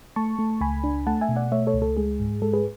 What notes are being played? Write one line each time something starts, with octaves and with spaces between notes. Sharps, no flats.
A3 A5 C#6
A3
C#2 G#5 B5
D4
A3 F#5 A5
E5 G#5
B2
D5 F#5
A3 C#5 E5
A4 C#5
C#2
A4
G#3 G#4
G#2
G#3 A4
G#4 B4